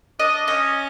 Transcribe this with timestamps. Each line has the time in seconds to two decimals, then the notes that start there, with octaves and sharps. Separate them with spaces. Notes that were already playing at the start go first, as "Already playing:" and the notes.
0.20 D4 D#5
0.48 C#4 D#5